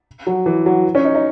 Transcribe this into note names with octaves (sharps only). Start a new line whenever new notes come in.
F#3
E3
F#3
C#4
D#4
D#4